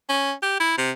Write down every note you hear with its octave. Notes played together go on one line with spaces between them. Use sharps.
C#4
G4
E4
C3